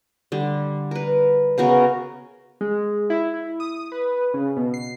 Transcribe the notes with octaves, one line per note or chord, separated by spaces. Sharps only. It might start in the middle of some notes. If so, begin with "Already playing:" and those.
D3 G3
A#4 B4
C#3 B3 F#4 A#4
G#3
E4
E4
D#6
B4
C#3
B2
C7